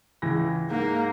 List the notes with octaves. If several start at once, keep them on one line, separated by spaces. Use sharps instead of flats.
C#2 E3 A#6
G#2 A#3